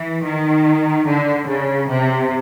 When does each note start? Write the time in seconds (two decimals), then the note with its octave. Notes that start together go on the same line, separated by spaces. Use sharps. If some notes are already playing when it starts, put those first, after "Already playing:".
Already playing: E3
0.24 D#3
1.06 D3
1.47 C#3
1.89 C3